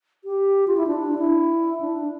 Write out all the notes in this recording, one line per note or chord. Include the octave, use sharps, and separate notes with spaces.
G4
F4
E4
D4
E4
D4